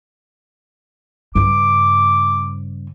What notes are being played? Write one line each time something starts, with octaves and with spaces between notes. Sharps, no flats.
G2 C#3 D6